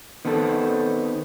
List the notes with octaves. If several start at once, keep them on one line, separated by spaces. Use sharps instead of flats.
D#3 B3 C4 A4